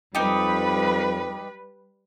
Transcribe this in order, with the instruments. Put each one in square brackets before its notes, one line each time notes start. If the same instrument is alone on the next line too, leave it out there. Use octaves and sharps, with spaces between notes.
[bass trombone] F2 [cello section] G3 B4 [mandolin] D#4 G4